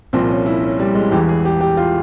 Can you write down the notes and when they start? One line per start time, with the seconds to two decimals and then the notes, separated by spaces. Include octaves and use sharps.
0.13 C2 A#2 F3 C4
0.29 C#4
0.46 E4
0.63 C#4
0.80 G3
0.95 G#3
1.11 E1 E2 E3 G4
1.29 G#4
1.45 G4
1.61 G4
1.77 F4